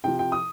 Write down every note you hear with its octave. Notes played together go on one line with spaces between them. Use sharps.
C3 F3 G5
G5
D#6